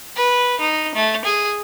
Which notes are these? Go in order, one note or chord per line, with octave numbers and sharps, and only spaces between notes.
B4
D#4
A3
G#4